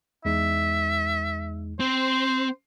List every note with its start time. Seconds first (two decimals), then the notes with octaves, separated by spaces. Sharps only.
0.25 E2 G#3 D#4 E5
1.80 C4 C5